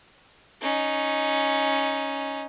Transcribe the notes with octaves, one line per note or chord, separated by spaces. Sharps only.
C#4 D#4